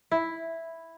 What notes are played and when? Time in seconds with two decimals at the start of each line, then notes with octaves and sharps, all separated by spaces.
0.11 E4